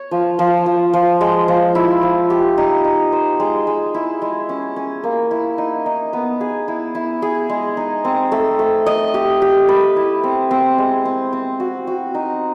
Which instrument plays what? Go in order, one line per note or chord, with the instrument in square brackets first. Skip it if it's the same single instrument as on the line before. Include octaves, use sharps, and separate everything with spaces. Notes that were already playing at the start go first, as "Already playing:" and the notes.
Already playing: [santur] C#5
F3
F3
F3
F3
G#3
F3
E4
F3
G4
D#4
D#4
C5
G#3
G#3
E4
G#3
C#4
C#4
A#3
E4
D#4
D#4
B3
G#4
E4
E4
G#4
G#3
D#4
C4
A3
A3
D#5
G4
G4
B4
E4
C4
C4
G#3
C4
C4
F#4
F#4
D#4